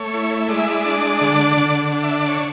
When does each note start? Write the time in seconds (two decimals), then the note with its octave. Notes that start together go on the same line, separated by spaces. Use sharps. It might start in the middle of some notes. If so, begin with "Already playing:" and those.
Already playing: A3 C#5
0.14 E4
0.49 G#3 D5
0.59 E5
0.67 D5
0.85 D4
1.21 D3
1.57 D3
1.93 D4
2.03 E5
2.16 D5
2.29 C#5